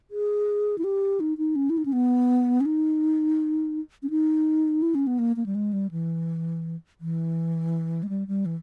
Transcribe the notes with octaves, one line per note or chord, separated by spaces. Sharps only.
G#4
E4
G4
D#4
D#4
C#4
E4
D#4
C#4
B3
C#4
D#4
C#4
D#4
E4
C#4
B3
A#3
A#3
G3
G#3
G3
E3
E3
G#3
G3
G3
E3